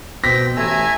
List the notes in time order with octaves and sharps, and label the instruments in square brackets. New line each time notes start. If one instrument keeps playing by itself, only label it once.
[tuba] B2 [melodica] C4 G5 [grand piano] A#6 B6
[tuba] A1 [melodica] A3 A#5 E6 [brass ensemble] E5 G#5